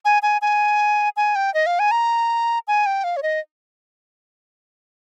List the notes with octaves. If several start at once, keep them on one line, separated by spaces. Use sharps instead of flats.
G#5
G#5
G#5
G#5
G5
D#5
F5
G#5
A#5
G#5
G5
F5
C#5
D#5